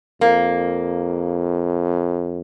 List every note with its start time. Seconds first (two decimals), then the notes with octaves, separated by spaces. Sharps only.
0.21 F2 A#3